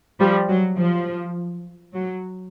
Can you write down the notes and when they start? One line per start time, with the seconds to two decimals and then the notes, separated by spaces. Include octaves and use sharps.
0.19 F3 G3
0.49 F#3
0.78 F3
1.93 F#3